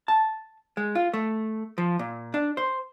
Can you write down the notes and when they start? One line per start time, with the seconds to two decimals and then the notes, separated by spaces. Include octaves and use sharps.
0.08 A5
0.77 G#3
0.95 F4
1.13 A3
1.78 F3
1.99 A#2
2.34 D4
2.57 C5